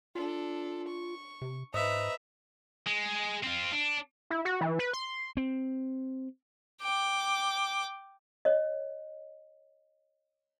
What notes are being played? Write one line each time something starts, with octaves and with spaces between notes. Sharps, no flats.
D4 F4 A4
C#6
C3
G#2 B4 C5 D#5 E5 A#5 D#6
G#3
C4 F4
D4
E4
F#4
E3
B4
C6
C4
G5 D6
C#5 D#5